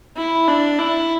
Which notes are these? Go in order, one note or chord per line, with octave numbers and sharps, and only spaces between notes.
E4
D4
E4